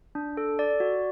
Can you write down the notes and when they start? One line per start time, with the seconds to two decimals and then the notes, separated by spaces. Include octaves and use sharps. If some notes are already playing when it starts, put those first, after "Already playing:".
0.15 D4
0.37 A4
0.59 D5
0.80 F#4